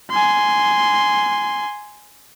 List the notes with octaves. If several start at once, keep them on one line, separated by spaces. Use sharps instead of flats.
G#5 C6